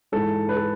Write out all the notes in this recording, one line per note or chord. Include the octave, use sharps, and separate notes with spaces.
G#2 E3 G#3 A4
B4
A4